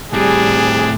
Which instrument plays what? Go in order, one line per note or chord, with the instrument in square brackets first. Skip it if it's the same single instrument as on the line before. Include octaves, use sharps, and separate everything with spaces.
[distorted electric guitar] A2 C4 [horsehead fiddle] G3 [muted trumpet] D4 [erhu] G#4